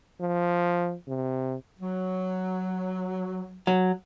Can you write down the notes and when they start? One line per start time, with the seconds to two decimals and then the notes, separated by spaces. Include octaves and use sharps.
0.21 F3
1.08 C3
1.80 F#3
3.67 F#3